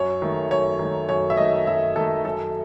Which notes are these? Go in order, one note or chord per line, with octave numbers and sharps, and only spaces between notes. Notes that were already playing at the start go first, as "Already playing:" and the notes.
Already playing: F#2 C#5
D#3 A3
F#2 C#5
D#3 A3
F#2 C#5
E5
D#3 A3 D#5
F#2 E5
D#3 A3 A4
F#2 A4